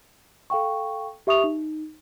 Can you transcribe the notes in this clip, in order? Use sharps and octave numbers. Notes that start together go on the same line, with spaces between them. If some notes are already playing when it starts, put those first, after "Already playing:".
A4 F5 G5 C#6
G4 E5 C#6 D#6 F7
D#4